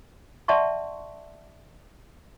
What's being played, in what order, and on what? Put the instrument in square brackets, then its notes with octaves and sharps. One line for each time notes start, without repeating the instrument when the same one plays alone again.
[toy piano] D5 E5 F#5 A5 C6 C#6